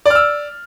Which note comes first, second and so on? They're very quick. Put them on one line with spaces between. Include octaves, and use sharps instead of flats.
D5 F6 E6